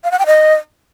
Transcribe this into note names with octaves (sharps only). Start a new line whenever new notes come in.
F5
F#5
G5
D#5